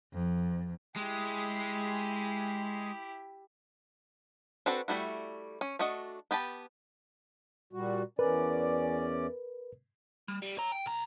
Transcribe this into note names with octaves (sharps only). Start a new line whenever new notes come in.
F2
G#3 E4 G4
C4 D4 F#4 A4 B4
G3 A3 E4 F#4
C#4
A3 D4 F#4 D#5
B3 G4 B4 A5
A#2 G3 F#4
E2 C#4 A#4 B4 D5
G3
G3
C#5 A#5
G5
B1 A#5